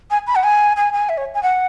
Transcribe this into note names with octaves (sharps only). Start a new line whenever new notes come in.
G#5
B5
F#5
G#5
G#5
G#5
E5
C#5
G#5
F#5